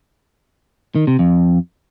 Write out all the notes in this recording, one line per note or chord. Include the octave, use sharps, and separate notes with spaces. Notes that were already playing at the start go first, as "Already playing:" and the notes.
D#3
C3
F2